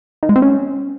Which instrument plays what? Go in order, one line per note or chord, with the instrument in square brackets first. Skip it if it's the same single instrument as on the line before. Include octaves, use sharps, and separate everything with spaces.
[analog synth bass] D#3
G#3
C4
C#4